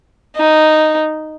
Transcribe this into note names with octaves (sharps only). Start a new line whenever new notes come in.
D#4